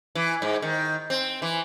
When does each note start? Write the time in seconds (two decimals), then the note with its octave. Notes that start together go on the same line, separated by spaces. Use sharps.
0.15 E3
0.42 G#2
0.62 D#3
1.10 C4
1.42 E3